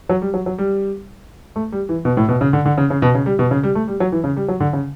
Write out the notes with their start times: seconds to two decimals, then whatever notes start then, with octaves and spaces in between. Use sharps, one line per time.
0.09 F#3
0.22 G3
0.34 F#3
0.46 F#3
0.58 G3
1.56 A3
1.72 G3
1.89 E3
2.05 B2
2.17 A2
2.28 B2
2.41 C#3
2.53 D3
2.66 D3
2.78 C#3
2.90 C#3
3.02 B2
3.15 C#3
3.26 G3
3.39 B2
3.51 C#3
3.63 G3
3.75 A3
3.88 G3
4.00 F#3
4.12 E3
4.24 C#3
4.37 G3
4.48 F#3
4.60 D3
4.73 C#3